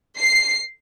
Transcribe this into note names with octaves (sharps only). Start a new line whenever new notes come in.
C7